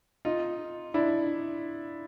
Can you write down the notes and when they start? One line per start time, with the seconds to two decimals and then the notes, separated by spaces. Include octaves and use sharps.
0.25 D#4 F4
0.94 D4 E4